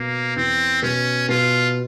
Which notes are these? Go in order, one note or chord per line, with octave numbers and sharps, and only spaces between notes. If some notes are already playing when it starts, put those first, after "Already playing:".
Already playing: B2 A#3
E2 C4
B2 C#4
B2 F4